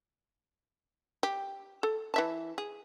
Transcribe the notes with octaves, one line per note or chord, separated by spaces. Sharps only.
G4
A4
E3 E5 A5
G#4